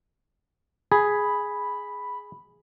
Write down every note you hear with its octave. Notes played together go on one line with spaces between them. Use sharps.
G#4 B5